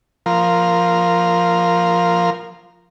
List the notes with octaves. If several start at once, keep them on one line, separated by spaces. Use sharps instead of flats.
F3 A#4